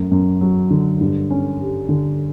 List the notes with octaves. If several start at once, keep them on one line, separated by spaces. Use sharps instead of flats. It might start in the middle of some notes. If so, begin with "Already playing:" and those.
Already playing: F#2 A3
F#2
F#3
D3
G2
C#4
G3
D3